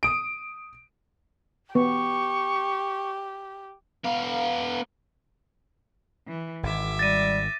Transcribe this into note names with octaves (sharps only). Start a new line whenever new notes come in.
D#6 D7
B3 G4 C#6
B3 F5
E3
G#1 E5 D6
G3 A6 A#6 D#7